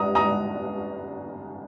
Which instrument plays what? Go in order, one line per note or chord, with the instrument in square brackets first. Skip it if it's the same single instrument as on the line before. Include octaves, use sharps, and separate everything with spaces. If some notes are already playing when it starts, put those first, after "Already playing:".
Already playing: [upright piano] A#5 D#6
A#5 D#6